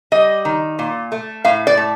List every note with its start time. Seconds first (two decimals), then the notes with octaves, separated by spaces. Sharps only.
0.12 G3 D#5
0.45 D#3
0.79 A#2
1.12 A3
1.45 A2 F5
1.67 D5
1.77 A3